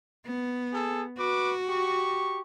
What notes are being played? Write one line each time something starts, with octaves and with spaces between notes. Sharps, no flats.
B3
G#4 A4
F#4 B4 D6
G4 C#6